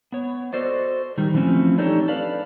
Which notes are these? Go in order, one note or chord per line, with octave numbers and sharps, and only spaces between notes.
B3 C#5
F#4 A4 C5 D5 D#5
D#3 G3
E3 F3 A3 C4 C#4
D4 D#4 G4 A4 C#5
A4 B4 D5 F5